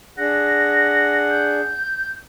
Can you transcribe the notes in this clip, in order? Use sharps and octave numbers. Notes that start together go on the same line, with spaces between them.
D4 G#4 F#5 A#6
G6